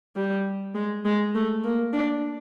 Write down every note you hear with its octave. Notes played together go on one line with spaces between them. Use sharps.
G3
G#3
G#3
A3
A#3
D4